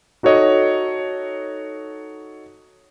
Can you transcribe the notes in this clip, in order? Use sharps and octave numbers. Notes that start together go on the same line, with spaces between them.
D#4 F#4 A4 C#5 D#5